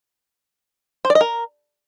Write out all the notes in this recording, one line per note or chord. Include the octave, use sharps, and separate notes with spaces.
C5
D5
D#5
A#4